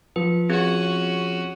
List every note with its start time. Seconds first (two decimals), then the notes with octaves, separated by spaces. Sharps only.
0.16 F3 B4
0.49 C4 C#4 F#4 G#4 G#6